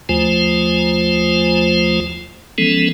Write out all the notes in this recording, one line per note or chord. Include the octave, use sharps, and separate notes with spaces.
D#2 F3 A3 F4 C5 G#5
E3 F3 G#3 B3 C#4 A4